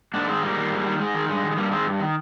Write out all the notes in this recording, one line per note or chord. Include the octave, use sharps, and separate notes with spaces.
G#2 A#3 D4
D#3 G#3 C4
G#2 G3 A#3
D#3
G#2
D#3
G#2 G#3
D#3
G2 G#3
D#3
G#3
G2 G3 A#3
D#3 G#3 C4
G2
D#3